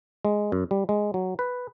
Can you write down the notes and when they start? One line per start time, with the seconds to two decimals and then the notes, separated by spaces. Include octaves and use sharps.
0.25 G#3
0.52 F#2
0.71 G3
0.89 G#3
1.14 F#3
1.39 B4